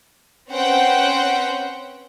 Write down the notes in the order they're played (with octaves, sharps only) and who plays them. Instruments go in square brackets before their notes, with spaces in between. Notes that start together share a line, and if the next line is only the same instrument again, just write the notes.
[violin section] C4 C#4 B4 C5 F#5 G5